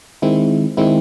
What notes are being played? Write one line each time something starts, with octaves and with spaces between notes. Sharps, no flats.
D#3 G#3 C4 E4
D#3 G#3 C4 E4